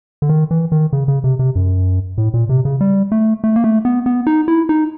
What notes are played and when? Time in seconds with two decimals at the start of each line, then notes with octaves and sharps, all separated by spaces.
0.22 D3
0.29 D#3
0.51 E3
0.72 D#3
0.93 C#3
1.08 C#3
1.24 C3
1.39 C3
1.55 F#2
2.18 A2
2.34 A#2
2.49 C3
2.65 C#3
2.81 G3
3.12 A3
3.44 A3
3.56 A#3
3.64 A3
3.85 B3
4.06 B3
4.27 D#4
4.48 E4
4.69 D#4